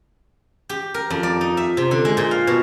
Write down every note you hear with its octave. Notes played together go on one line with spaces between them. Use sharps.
G4
A#4
F2
D5
D#4
E5
C3
D3
G#3
A#2
F5
B2